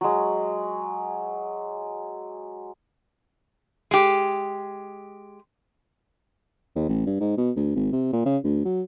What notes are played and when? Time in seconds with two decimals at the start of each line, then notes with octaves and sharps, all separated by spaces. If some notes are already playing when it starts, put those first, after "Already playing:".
0.01 F#3 G#3
3.91 G#3 G4
6.76 D#2
6.89 A1
7.06 G2
7.20 G#2
7.37 B2
7.56 D2
7.76 G#1
7.93 C3
8.13 A#2
8.26 C#3
8.44 D2
8.65 F#3